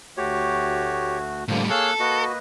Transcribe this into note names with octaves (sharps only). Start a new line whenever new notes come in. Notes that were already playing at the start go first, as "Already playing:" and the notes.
D2 A3 F#4 G4 C#5
A2 D3 F3 G3 A#3
A#3 G#4 A4 C#5 F5 E6 F#6
A#3 F#4 B4 D#5